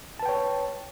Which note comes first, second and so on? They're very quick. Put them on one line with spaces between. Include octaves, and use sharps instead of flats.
A5 B4 G5 C#5